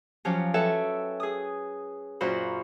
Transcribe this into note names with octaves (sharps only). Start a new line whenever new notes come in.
F3 F#3 C#4 G4
A4 B4 C#5 E5 G5
G#4 D#6
F#2 A#2 F#4 C5 B5